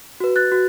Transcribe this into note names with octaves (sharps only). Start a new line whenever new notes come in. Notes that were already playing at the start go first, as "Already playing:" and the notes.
F#4 B4
F#6 A6
F#4